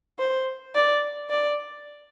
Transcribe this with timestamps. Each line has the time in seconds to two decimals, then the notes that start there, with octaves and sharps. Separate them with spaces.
0.19 C5
0.75 D5
1.30 D5